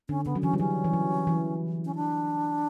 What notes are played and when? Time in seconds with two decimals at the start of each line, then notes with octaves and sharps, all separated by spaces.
0.09 D3 C#4
0.25 C#3 B3
0.35 F#3
0.42 E3 C#4
0.53 G3
0.59 F#3 C#4
0.84 E3
0.93 F#3
1.27 E3
1.85 C#4
1.95 D4